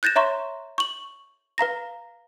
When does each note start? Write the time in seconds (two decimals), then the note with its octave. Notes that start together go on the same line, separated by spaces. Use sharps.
0.03 F#6 G6 A6 A#6 E7
0.16 C#5 E5 A#5 C6 C#6
0.78 C#6 F#7
1.58 B4 F5 A#5 A#6